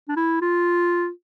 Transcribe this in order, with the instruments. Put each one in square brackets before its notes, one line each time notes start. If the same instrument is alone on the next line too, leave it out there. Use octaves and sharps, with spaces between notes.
[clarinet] D4
E4
F4